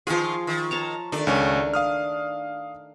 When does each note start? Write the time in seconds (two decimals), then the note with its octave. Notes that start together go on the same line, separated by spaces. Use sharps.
0.07 D#3 F3 F4 G#4
0.47 D#3
0.71 C#5 A5 A#5
1.12 D#3 A3 D4
1.27 C#2 C#4
1.74 F5 D#6 F6